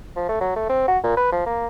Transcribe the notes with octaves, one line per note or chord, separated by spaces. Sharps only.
F3
A3
F#3
A3
C4
F#4
A#2
B4
F3
A#3